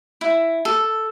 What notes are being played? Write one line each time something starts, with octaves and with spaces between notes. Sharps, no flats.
E4
A4